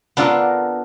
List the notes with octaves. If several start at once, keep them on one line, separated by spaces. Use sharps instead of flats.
B3 D4 F4 A4 A#4